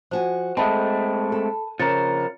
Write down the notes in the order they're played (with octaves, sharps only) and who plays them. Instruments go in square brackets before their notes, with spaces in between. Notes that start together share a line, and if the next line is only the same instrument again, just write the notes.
[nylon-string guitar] F3 F#4 G#5 [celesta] C5
[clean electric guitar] G#3 A3 C4 [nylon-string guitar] G#4 A4 D#5 [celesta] A5 B5
[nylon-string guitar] A4
[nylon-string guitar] C#3 [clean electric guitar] F3 A#4 [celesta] A6 C#7